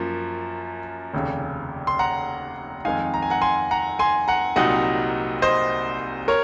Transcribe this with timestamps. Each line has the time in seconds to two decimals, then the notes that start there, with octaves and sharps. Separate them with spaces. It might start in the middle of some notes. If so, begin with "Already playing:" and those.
Already playing: F#2 F3 A#3
1.14 F1 D#2 C#3
1.87 C6
1.99 F#5 A#5
2.85 F2 D#3 G#3 D#4 F5 G#5
3.14 A#5
3.22 G#5
3.30 F#5 A#5
3.42 G#5 C6
3.71 F#5 A#5
3.99 G#5 C6
4.28 F#5 A#5
4.56 C2 A#2 F#3 C4 D#4 D#5 F#5
5.42 C5 D#5
6.28 A#4 C#5